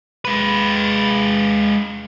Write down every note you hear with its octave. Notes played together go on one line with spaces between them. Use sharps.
G#3 B4